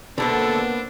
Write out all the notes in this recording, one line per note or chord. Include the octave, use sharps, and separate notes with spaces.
D2 B2 D3 A#3 B3 D4 A4 C5